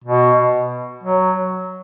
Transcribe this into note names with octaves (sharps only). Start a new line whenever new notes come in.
B2
F#3